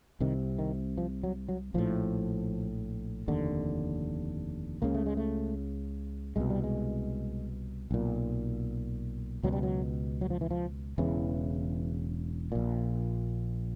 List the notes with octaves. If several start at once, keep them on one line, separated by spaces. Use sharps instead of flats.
C2 C3 D#3
D#3
F3
F#3
F#3
A#1 A2 F3
F1 D#2 D3
C#2 C#3 A#3
A3
G#3
A3
C2 B2 G#3
G3
G#3
B1 A#2
C#2 B2 F#3
G3
F#3
F#3
F3
E3
F3
E1 E2 C#3 E3
A#1 A#2